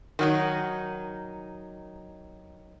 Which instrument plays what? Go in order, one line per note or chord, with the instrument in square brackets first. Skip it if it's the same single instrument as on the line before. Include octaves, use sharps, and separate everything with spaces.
[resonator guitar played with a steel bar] D#3 F#3 D#4